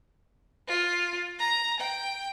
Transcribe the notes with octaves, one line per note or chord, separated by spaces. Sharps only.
F4
A#5
G5